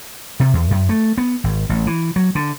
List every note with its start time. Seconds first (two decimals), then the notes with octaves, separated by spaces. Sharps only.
0.40 C3
0.53 E2
0.71 F#2
0.89 A3
1.18 B3
1.44 G#1
1.69 A1
1.87 E3
2.16 F#3
2.35 D3